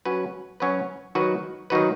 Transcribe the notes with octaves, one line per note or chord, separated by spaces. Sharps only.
F#3 C#4 F#4 B4
F#3 C#4 F#4 B4
D#3 F#3 D#4 F#4 B4
D#3 F#3 D#4 F#4 B4